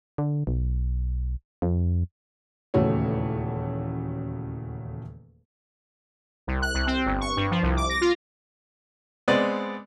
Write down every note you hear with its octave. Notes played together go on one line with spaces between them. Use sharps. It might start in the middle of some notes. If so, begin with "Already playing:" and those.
D3
B1
F2
D#1 E2 C#3 A3 F#4 C#5
C2
F#6
C2
C4
G1
C#6
G2
F3
C2
D6
A#6
F4
G#3 B3 C4 B4 D5